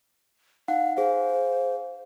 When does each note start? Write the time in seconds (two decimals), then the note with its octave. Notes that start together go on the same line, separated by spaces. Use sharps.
0.68 D#4 F5 F#5
0.97 G#4 C5 F5